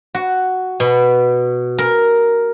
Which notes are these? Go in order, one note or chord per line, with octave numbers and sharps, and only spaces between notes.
F#4
B2
A#4